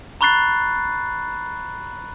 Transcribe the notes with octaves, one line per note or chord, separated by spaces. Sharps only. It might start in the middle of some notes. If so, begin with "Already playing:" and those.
A#5 B5 C#6 F#6 A6 C7